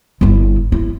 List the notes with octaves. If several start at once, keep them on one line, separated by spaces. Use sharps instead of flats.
G1 E4
E4